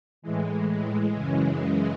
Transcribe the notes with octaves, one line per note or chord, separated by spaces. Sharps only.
A2 E3 G#3
G#3
F#2 C#3 E3